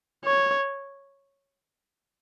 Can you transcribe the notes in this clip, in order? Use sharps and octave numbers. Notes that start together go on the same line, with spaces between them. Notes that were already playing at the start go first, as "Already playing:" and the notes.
C#5